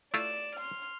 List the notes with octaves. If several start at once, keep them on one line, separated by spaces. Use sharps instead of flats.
A3 E4 F4 D5 E7
C6 F6